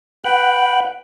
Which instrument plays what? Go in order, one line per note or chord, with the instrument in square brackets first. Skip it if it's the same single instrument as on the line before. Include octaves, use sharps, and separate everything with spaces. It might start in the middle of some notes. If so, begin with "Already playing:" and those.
[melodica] B4 G5 [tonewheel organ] F#5